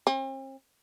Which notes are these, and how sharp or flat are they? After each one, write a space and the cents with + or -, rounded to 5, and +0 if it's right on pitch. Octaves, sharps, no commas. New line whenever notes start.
C4 +45